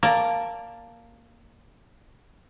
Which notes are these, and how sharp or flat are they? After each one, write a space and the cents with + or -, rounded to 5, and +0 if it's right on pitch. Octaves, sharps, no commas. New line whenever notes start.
A#3 +0 D5 +0 A5 +0